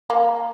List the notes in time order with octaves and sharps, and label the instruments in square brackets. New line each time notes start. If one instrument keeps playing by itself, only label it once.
[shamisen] A#3